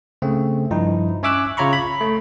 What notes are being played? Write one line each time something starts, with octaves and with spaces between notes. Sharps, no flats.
C#3 A3 C4
G2 F3 D#4 E4
C#4 C#5 E5 D6 E6 F#6
C#3 F4 C#5 A#5 B5 C#6
B5
A3